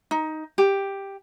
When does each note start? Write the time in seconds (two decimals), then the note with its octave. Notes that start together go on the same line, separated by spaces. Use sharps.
0.11 D#4
0.58 G4